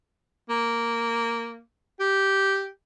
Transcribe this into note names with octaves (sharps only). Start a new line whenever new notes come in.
A#3
G4